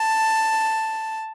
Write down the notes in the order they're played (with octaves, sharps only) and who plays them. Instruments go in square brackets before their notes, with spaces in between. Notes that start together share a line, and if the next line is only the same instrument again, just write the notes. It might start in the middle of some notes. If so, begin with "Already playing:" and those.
Already playing: [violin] A5